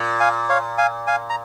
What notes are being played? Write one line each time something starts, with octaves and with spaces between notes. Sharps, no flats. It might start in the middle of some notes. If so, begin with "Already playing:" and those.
Already playing: A#2
F5 G#5
C#5 F5
F5 G#5
F5 G#5
A#5